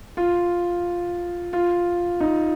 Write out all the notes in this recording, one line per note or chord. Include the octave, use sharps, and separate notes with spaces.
F4
F4
D#4